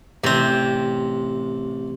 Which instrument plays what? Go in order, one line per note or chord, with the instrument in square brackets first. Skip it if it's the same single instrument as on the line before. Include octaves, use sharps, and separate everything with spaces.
[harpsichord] A1 A#5 [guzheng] C3 C4